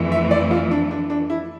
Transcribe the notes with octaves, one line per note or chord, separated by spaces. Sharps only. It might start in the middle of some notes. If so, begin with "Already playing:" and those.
Already playing: F2 E3 A3
E5
D5
F4
D4
D4
D4
E4